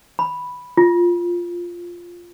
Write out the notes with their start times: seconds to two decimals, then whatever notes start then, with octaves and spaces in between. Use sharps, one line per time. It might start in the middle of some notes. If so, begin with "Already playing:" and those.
0.19 B5
0.77 F4